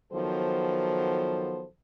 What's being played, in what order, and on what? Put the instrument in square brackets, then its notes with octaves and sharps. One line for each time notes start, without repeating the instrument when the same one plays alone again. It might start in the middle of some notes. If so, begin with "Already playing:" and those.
[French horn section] D#3 F3 F#3 B3 A4 C5